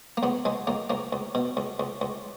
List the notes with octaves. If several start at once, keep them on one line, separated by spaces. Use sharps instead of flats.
A#3
C#2 B3
C#2 G#3
C#2 A#3
C#2 A#3
C#2
B2
C#2
C#2
C#2